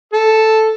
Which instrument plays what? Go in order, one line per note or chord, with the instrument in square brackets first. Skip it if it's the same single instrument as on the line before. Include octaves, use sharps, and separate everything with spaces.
[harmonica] A4